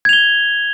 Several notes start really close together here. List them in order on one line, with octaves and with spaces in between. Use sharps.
G#6 F7 G7